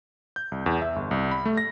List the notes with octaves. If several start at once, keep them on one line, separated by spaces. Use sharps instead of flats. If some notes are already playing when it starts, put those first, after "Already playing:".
G6
C2
E2
E5
G1
C2
B5
A3
A#6